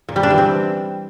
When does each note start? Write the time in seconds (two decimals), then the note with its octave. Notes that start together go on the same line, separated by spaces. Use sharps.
0.09 A#2
0.16 G3
0.23 D4
0.31 E3
0.38 C4